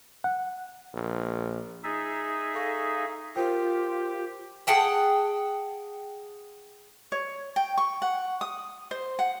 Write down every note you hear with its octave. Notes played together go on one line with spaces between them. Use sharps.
F#5
A#1
D#4 G#4 E5 E6 A6
A4 F5 C#6 A#6
F4 G4 A#4 C5 G5
G#4 F#5 G5 A5
C#5
G5
C#6
F#5
D#6
C5
F#5